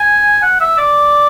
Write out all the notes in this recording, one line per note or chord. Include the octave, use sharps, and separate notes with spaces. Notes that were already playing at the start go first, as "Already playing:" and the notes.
Already playing: G#5
F#5
E5
D5